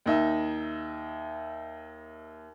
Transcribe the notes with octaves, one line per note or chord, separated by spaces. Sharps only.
D#2 D#4 E5